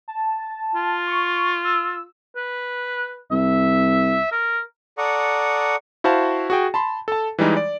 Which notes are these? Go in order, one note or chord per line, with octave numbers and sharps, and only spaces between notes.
A5
F4
C#6
E6
B4
C2 E5
A#4
A4 D5 F#5 A#5 C#6 D#6
E4 F#4 C5 F5 A5
F#4 G#4 G5
A5 B5 C6
A4 A5
E3 G3 G#3 D#4
D5